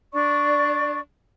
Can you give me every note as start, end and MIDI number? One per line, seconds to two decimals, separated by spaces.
0.13 0.99 62
0.13 0.99 74
0.13 0.99 85